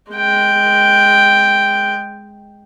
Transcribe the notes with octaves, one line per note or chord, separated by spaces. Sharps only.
G#3 G5